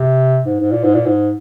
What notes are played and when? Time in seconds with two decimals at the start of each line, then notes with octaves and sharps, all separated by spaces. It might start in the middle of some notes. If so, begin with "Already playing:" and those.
Already playing: C3
0.46 G#2
0.60 G#2
0.72 A#2
0.84 G#2
0.95 A#2
1.06 G#2